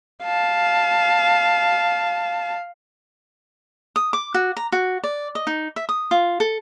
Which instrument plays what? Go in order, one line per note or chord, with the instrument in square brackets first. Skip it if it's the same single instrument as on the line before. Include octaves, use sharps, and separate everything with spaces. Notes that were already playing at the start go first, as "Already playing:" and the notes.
[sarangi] F5 [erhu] A5
[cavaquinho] D#6
D6
F#4
A#5
F#4
D5
D#5
D#4
E5
D#6
F4
A4